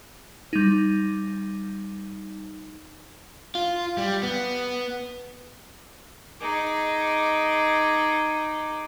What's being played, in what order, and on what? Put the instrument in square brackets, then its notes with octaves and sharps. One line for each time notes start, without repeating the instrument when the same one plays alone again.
[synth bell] G3 D#4
[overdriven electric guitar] F4
G3
B3
[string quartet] D#4 G#4 D6